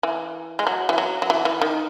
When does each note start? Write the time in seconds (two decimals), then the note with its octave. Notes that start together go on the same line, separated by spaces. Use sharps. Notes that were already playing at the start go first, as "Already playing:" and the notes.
0.03 E3
0.59 G#3
0.67 F#3
0.89 E3
0.98 F#3
1.22 F#3
1.30 E3
1.45 E3
1.61 D#3